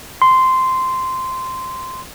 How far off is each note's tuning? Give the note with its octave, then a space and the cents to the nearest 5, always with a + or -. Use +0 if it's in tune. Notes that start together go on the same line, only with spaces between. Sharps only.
C6 -10